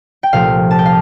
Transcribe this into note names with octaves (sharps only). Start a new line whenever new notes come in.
G5
C2 A#2 F3 A3 F5
A5
G5
F5